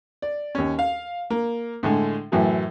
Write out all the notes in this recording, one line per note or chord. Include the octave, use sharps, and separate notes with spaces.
D5
D#2 C#4
F5
A#3
A2 D3 G#3
F#2 A2 E3 F#3